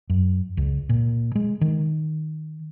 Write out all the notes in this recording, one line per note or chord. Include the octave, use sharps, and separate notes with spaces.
F#2
C#2
A#2
G#3
D#3